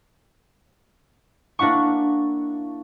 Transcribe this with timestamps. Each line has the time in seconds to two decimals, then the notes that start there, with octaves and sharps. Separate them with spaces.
1.59 A#3 D4 E4 F#5 C#6